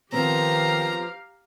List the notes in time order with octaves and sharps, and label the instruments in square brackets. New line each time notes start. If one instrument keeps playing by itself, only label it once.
[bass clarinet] D#3 [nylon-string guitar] F3 B3 C4 [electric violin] G4 F5 [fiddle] A#5